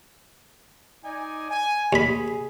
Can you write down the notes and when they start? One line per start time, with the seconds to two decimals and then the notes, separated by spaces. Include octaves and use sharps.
1.04 D#4 D5 G#5
1.50 G#5
1.93 D#2 G#4 B5